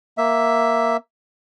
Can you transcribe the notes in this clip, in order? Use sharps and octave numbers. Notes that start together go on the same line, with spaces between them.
A#3 E5